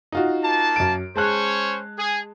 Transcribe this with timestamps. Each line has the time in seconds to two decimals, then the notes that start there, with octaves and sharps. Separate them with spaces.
0.12 D#4 F4 F#4
0.43 A#3 A5
0.76 F#2 D7
1.16 G#3 C#4 C5 C#5 A5 F#6
1.96 G#4